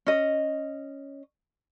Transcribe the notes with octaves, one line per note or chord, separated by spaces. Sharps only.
C#4 D#5